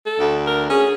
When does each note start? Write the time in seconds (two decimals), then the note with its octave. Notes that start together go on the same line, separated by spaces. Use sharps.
0.06 A4
0.20 D2
0.46 A#4
0.70 C#4 G#4